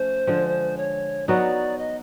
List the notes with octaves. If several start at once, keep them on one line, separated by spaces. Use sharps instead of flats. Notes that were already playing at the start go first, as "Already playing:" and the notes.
Already playing: F3 A3 C#4 C5
D3 F3 G#3
C#5
F#3 B3 D#4 F#4 D5
D#5